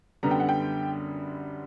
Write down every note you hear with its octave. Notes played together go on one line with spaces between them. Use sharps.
F#2 D3 G3 B3 A#5
G5
F#5
G5